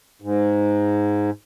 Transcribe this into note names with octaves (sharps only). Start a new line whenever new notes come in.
G#2